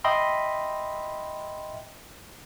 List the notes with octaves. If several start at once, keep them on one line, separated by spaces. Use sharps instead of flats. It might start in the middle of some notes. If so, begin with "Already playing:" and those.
D#5 E5 G5 B5 C6